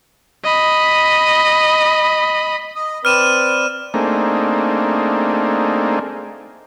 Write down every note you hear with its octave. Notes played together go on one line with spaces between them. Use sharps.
D#5 B5
D#5
C4 B4 D5 F6 D#7 E7
A3 A#3 C4 D4 D#4 G#4